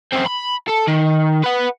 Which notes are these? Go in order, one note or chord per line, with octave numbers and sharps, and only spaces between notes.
F#2 C4
B5
A4
D#3
B4 F#5